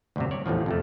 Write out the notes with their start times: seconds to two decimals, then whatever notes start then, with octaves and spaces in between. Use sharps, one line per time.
0.16 D2 G2 C3
0.31 C#5 D5
0.46 A1 E2 A2 F3
0.66 F2 C3 A3